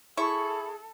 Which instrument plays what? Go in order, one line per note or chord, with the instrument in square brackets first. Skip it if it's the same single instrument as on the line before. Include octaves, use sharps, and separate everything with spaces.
[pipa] E4 [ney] G#4 [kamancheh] A4 [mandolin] C#6